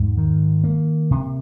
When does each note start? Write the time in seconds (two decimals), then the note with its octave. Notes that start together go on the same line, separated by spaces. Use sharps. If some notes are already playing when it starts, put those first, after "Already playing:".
Already playing: E2 G#2
0.17 D#3
0.64 A#3
1.11 C3